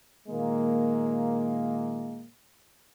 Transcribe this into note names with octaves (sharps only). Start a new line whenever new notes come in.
A#2 D#3 G#3 A#3